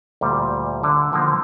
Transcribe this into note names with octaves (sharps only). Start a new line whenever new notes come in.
D2 A#2 G3
D3
B2 D3 D#3 F3 A#3